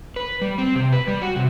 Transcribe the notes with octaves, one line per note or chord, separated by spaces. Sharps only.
B4
G3
C4
C3
B4
G3
F#4
C3